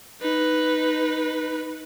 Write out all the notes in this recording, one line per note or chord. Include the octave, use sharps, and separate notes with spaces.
D#4 B4